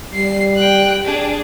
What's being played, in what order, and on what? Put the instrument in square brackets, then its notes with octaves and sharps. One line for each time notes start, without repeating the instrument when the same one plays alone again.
[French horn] G3 [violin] C7
[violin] G5 F#6
D4 G#4